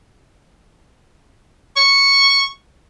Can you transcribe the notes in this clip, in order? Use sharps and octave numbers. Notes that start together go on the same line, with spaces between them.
C#6